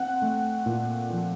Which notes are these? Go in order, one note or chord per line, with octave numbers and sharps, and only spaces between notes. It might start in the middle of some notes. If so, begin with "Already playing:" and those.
Already playing: C4 F#5
A3
A#2
F3